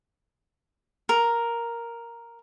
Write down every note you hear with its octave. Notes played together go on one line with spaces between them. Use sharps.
A#4